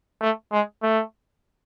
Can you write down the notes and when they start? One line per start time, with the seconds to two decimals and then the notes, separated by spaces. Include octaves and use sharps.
0.21 A3
0.52 G#3
0.83 A3